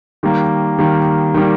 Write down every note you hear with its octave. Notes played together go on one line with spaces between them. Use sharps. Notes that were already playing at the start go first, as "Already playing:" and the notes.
D#3 G3 A#3
D#3 G3 A#3
D#3 G3 A#3